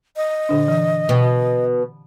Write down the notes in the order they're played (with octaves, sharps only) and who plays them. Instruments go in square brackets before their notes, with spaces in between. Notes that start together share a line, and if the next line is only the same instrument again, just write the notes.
[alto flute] D#5
[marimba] A#2 D3 D4
E3
[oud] B2